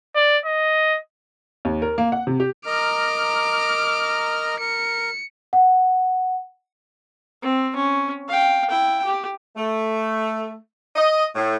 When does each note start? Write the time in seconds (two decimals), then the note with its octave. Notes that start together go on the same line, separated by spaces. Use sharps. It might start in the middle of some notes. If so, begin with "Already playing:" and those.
0.15 D5
0.46 D#5
1.65 D#2
1.82 A#4
1.98 A#3
2.12 F#5
2.27 C3
2.40 G4
2.66 A#4 D#5 A#5 D6 F6
4.60 A#4 C#7
5.53 F#5
7.42 C4
7.75 C#4
8.28 F5 G5
8.70 E4 G5
9.04 G4
9.56 A3
10.96 D#5
11.36 A2